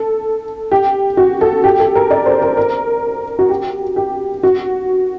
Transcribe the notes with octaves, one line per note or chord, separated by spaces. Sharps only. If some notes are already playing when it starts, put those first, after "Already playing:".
Already playing: A4
G4
F#4
A4
G4
A4
A#4
D5
C5
A#4
A#4
F#4
G4
G4
F#4